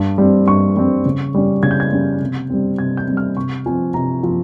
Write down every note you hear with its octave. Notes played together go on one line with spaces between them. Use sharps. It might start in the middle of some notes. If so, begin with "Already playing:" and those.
Already playing: G2
G3 C4
G2 C#6
G3 C4
C#3
G3 C#4
C#3 G#6
G6
G#6
G3 C#4
C3
G3 C4
C3 G#6
G6
G3 C4
F6
C3 C#6
F3 C4 G#5
C3 A#5
F3 C4